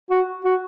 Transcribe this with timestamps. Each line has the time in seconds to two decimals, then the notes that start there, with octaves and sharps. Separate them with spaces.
0.10 F#4
0.45 F#4